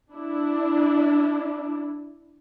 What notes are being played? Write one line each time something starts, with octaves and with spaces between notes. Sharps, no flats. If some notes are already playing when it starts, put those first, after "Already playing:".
D4 E4